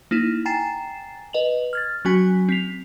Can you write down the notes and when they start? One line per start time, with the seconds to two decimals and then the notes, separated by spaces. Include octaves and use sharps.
0.11 A#3 D#4 E4
0.46 G5 G#5 A#5 A6 C7 E7
1.33 B4 D#5 F7 F#7
1.73 F6 G#6 A6
2.05 F#3 C#4 F#4 G#5 B6
2.49 C4 B6 F7